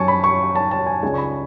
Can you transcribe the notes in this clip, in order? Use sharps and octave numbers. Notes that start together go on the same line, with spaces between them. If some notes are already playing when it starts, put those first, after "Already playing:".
Already playing: F#2 G#5 A5 C#6
B5
C#6
A5
A5
G#5
C#2 C#3 G#3 D4 G#5
C#6
B5